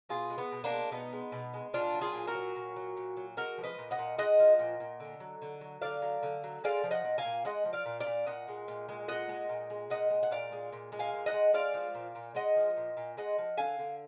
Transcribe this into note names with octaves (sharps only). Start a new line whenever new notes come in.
B2 F4 G#4
G#3
B3
B2
A#3 D4
G#3
B2 B3 D#4
G#3
B2
G#3
A#2 D4 F4
F#3
F4 G#4
A#2
F#4 A#4
F#3
A#2
F#3
A#2
F#3
G#3 F#4 A#4
F3
B4 D#5
A#2
D#5 F#5
A#2
G#3 D#5 F#5
F3
A#2
A#2
D3
F#3
D3
F#3
D3 D5 F5
F#3
D3
F#3
G#3 D5 F5
F3
D#5 F#5
A#2
F5 G#5
A#2
G#3 D#5 F#5
F3
D5 F5
A#2
D5 F5
A#2
A#2 D#5 F#5
G#3
A#2
G#3
A#2 D#5 F#5
G#3
A#2
G#3
A#2 D#5 F#5
G#3
F#5
A#2 D5 F5
G#3
A#2
G#3
F5 G#5
A#2
D#5 F#5
G#3
G#3 D5 F5
F3
A#2
A#2
G#3 D#5 F#5
F3
A#2
A#2
G#3 D#5 F#5
F3
D3 F5 G#5
D3